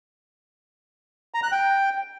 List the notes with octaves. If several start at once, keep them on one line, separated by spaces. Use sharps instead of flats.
A#5
F#6
G5